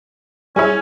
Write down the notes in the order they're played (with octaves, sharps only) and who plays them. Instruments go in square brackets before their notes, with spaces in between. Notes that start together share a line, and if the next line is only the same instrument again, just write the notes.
[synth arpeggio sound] G3 E4 [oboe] C#4 [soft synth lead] G#4 [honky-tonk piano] C#5 G#5